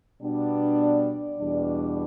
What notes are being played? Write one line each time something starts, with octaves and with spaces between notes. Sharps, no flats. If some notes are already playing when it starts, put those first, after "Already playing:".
B2 G3 B3 D4
D5
E2 B2 G3 D4